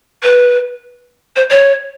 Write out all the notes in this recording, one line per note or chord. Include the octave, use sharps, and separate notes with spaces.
B4
C5
C#5